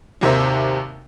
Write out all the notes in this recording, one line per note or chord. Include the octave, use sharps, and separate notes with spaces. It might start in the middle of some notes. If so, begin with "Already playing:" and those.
G#1 D#2 C3 A#4 C5 E5